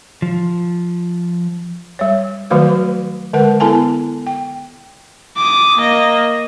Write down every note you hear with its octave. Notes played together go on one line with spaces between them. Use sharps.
F3
G3 C#5
D#3 F#3 A3 F#4 B4 C5
D3 G#3 A#4 B4 F#5
B3 E4 A4 G#5 A5
G5
D6 D#6
A#3 D#5